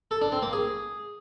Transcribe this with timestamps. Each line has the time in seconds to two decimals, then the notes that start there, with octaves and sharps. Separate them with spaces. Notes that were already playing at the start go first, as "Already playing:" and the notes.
0.11 A4
0.21 D4
0.32 C4
0.42 A#3
0.53 G#4